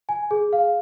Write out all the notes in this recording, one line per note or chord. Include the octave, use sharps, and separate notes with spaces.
G#5
G#4
F5